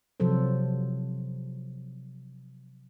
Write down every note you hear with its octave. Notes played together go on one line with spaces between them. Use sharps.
C3 F3 F#3 A4 C5